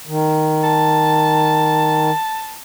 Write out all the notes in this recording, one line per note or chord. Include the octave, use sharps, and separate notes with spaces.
D#3
A5